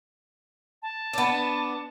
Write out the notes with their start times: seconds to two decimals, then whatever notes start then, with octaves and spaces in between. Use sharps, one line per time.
0.82 A5
1.13 B3 D4